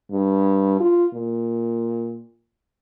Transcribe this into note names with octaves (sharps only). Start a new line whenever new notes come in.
G2
F4
A#2